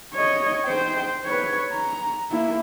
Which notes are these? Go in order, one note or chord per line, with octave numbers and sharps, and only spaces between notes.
C#5 D#5
C5 G5
B4 C#5
A#5
A#3 E4